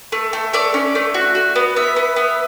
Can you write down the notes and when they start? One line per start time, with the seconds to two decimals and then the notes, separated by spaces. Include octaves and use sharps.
0.12 A3
0.33 A3
0.53 A3 D5
0.74 C#4
0.95 A3
1.14 F#4
1.35 F#4
1.56 B3
1.76 B3 E5
1.96 B3
2.16 B3